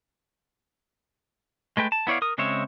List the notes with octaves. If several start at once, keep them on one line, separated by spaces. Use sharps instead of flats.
G#3 A3 B4 G5
A5
B3 E4 C#5 D5 F5
A#4 D#6
C#3 G#3 C4 C#5 E5